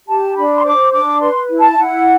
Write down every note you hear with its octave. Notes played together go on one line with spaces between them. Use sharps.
G4 A5
D4 B5
C6
C5 D6
D4 D6
B4 C6
E4
A5
E5
E4 F#5